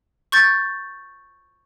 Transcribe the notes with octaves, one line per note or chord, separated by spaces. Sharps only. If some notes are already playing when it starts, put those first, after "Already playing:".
C#6 G6 A6